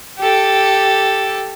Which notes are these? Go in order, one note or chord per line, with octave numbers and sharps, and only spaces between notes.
G4 A4